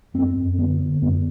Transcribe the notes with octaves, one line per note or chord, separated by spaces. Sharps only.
F#2 C4
F#2
D3 B3
D3
F#2 B3